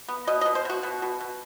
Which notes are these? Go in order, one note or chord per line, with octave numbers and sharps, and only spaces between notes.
B3
B2 D#5
D#5
B2
C5
B2 F#4
B2
B2
B2